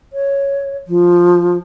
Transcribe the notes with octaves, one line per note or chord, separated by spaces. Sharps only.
C#5
F3